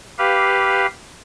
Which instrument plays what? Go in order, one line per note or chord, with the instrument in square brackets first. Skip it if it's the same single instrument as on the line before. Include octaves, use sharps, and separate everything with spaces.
[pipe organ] G4 B4 F5